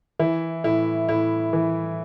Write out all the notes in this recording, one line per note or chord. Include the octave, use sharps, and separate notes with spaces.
E3 E4
A2 E4
A2 E4
E3